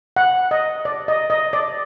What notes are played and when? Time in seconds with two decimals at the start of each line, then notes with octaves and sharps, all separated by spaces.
0.16 F#5
0.51 D#5
0.85 D5
1.08 D#5
1.30 D#5
1.53 D5